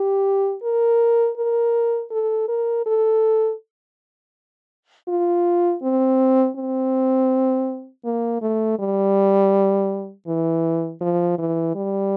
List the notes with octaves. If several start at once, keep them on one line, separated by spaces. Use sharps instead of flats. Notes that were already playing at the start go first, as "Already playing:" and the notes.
Already playing: G4
A#4
A#4
A4
A#4
A4
F4
C4
C4
A#3
A3
G3
E3
F3
E3
G3